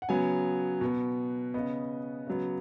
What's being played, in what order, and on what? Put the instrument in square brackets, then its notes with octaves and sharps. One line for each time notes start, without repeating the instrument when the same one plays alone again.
[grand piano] F#5
C#3 F#3 B3 G#5
B2 B3
C#3 B3 D#5
C#3 F#3 B3